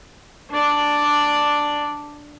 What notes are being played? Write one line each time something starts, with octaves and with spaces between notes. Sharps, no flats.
D4 D5